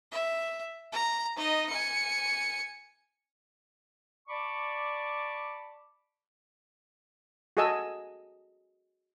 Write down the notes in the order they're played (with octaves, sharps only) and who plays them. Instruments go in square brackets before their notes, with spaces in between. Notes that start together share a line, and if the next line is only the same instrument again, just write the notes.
[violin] E5
A#5
D#4 D#5
G#5 C#7
[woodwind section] D5 A5 B5 C#6 D6
[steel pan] F#4 G#4 A4 D#5 G#5 E6